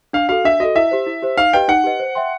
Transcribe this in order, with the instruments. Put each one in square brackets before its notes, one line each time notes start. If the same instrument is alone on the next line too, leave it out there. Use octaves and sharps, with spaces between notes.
[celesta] D4 [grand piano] F5
[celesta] F#4 A4 [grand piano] F5
[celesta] D4 [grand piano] E5
[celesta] F#4 A4 [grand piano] D#5
[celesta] E4 [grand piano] E5
[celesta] G4 C5
E4
G4 C5
[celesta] D#4 [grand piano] F5
[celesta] G4 B4 D#5 [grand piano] G5
[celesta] D#4 [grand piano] F#5
[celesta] G4 B4 D#5
C5
E5 G5 C6